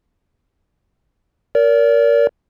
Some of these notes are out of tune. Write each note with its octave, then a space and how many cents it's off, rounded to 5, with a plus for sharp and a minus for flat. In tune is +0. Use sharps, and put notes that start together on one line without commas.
A#4 +0 D5 -40